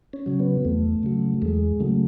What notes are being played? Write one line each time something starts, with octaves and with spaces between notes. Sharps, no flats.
C#4
C#3 F#3
B3
E2 A3
C#3 F#3
E2 G#3
C#3 F#3 A3